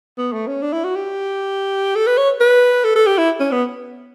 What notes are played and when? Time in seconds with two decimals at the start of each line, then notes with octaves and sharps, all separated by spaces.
0.18 B3
0.33 A3
0.47 C#4
0.62 D4
0.73 E4
0.84 F#4
0.96 G4
1.96 A4
2.07 B4
2.18 C#5
2.41 B4
2.84 A4
2.96 A4
3.07 G4
3.18 E4
3.40 C#4
3.52 B3